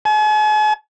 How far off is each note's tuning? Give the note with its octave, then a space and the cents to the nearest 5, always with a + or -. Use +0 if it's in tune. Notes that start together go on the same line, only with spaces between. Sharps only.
G#5 +45